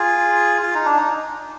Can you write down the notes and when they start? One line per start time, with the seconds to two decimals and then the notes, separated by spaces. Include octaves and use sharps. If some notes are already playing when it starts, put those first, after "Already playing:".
Already playing: F4 G#4
0.62 F4
0.75 D#4
0.86 D4
0.97 D#4